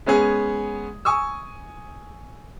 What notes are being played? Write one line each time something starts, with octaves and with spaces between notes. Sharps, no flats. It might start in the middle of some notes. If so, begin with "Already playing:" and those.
G#3 B3 C#4 G#4
G#5 C#6 D#6 E6